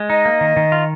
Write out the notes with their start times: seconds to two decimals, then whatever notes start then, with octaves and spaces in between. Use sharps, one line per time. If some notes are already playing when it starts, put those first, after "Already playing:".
Already playing: G#3
0.10 D#4 D#5
0.25 A#3
0.41 D#3
0.57 D#3
0.72 F4